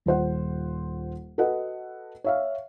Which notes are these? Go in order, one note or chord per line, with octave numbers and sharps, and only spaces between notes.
D#1 F4 C5 F#5
F#4 A4 B4 D#5 F#5
C#5 E5 F5